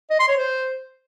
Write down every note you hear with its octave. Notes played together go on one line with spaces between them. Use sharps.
D#5
C6
C#5
C5